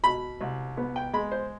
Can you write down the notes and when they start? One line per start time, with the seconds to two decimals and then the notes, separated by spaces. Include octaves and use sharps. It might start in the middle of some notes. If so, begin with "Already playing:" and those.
0.03 B2 B5
0.41 C2
0.77 B3
0.96 G5
1.13 G#3 B5
1.32 C5